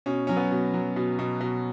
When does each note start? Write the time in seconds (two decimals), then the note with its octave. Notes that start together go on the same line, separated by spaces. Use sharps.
0.06 B2 C#4
0.27 F#3 C#4
0.36 B3
0.52 B2
0.74 F#3
0.96 B2
1.19 B2
1.41 B2